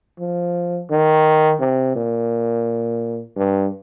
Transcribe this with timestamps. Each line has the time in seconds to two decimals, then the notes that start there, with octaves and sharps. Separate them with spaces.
0.19 F3
0.90 D#3
1.60 C3
1.95 A#2
3.36 G2